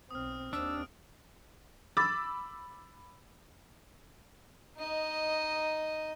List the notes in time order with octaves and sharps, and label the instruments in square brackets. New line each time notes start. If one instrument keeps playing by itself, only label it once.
[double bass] B1 C4 [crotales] D#6 F6
[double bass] D#2 C4 [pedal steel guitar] D4 [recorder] E6 [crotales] D7
[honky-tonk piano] B5 D6 E6 A6
[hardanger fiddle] D#4 D#5